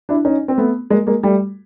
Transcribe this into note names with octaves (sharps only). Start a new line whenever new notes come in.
D4 E4
C#4 D#4
C4
A3 B3
G#3 A#3
G#3 A#3
G3 A3